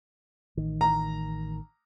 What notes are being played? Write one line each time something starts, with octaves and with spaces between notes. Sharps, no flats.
A1 D#3
A#5